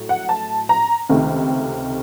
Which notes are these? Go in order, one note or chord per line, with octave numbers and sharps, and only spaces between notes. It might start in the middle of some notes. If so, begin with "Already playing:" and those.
Already playing: A2 F#3 A3
F#5
A5
A#5
C#2 C3 D#3 A3